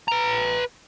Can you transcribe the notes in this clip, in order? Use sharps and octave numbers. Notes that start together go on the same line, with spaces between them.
B4 A#5